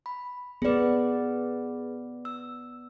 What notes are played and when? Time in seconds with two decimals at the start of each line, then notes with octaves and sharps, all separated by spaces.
0.06 B5
0.62 B3 G#4 B4 D5
2.25 E6